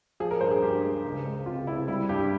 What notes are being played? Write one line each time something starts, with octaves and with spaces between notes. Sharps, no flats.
F3 G#4
A#4
G2 C5
G#4
G2 G4
G#3
C#2
G#3
C3 F4
C3 E4
G3 E4
G2 G4